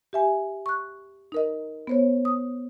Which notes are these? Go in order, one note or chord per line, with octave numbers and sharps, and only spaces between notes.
G4 E5 G#5
C#6 F#6
D#4 A#4 D#5
B3 C5 C#5
D#6